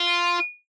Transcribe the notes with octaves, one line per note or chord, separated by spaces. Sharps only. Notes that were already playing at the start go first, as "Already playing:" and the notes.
Already playing: F4